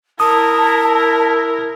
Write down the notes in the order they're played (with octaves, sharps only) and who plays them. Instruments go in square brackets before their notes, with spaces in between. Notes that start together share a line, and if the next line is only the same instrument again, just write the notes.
[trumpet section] E4 [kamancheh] A#4 [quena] A5 [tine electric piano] D#6